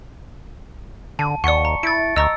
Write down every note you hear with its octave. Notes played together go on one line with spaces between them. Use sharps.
D3 A5
D#2 D5 F#5 C#6 C#7
A#5
E4 A6 D7
D2 D#5 A#5 C#6 E6